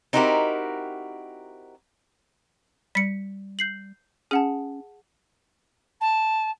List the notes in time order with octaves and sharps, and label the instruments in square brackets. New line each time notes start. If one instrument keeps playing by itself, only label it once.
[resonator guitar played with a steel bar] C4 D#4 E4 F#4 G4 A#4
[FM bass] G3 [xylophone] B6 C#7
[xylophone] G6 C7 F#7
[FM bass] C#4 [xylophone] G#4 F#5 A5
[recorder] A5